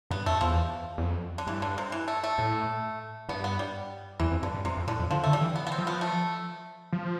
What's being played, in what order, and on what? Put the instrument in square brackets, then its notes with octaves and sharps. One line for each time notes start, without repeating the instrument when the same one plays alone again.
[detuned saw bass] G2 [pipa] B3
[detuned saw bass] F2 [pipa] A3
[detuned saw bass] E2 [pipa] F3
[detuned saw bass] E2
F2
[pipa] D3
[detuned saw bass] G2 [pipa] E3
[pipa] D3
C3
E3
A3
A3
[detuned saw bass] A2
[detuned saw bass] G2 [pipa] B3
[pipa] B3
G3
[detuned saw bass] E2 [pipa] E3
[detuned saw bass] F2
[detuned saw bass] G2 [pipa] D3
[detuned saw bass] G2
[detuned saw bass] F2 [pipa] C3
[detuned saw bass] F2
[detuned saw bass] A2 [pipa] D3
[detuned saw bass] F2
[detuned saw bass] D3 [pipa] F3
[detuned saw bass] D3 [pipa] A3
[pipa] G3
[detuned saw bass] E3
[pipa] B3
B3
C4
[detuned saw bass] F3
[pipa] B3
A3
[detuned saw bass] F3